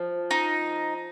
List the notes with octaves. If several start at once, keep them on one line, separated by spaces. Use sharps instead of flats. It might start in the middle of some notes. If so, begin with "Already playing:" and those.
Already playing: F3
D#4